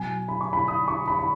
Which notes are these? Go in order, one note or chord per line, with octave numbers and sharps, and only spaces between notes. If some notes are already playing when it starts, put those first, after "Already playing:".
Already playing: B2 F#3 G#5
B5
C#6
B5
D#6
C#6
B5
B5